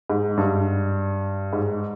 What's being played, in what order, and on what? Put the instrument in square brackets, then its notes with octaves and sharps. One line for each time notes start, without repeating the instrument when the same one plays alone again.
[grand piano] G#2
G2
G#2